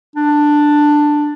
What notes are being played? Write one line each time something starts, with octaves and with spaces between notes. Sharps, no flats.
D4